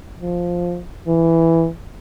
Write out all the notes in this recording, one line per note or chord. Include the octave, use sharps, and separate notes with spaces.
F3
E3